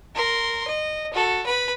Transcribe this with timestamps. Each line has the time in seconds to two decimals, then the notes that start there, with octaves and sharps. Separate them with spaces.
0.15 A#4 C6
0.68 D#5
1.13 F#4 A4
1.46 B4 B5